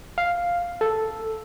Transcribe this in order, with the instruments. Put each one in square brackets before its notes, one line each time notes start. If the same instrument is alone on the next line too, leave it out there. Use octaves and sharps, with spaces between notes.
[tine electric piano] F5
A4